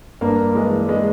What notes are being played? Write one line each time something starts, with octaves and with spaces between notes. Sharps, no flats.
G2 A#3
E3 G#3
G#3